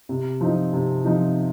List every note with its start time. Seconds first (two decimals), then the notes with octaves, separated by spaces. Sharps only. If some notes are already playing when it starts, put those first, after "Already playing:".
0.09 C3
0.41 F3 C4 D#4
0.73 C3
1.04 F3 C4 D#4